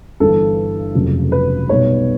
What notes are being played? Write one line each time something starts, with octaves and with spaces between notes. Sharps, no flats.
G1 G2 E3 A4
F1 F2 C#3 F#3
B4
B1 B2 G3 B3 C#5